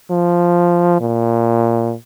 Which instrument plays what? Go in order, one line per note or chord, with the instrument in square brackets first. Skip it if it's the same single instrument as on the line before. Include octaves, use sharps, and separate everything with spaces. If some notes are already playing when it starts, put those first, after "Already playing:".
[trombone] F3
A#2